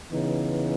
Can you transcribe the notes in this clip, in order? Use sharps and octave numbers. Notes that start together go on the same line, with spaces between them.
C#3 E3 B3 D#4